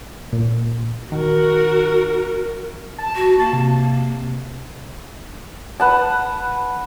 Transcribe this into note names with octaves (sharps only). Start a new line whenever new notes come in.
A#2
D#3 F#4 A#4
A5
F#4
A#3 A5
C3
B4 F#5 A5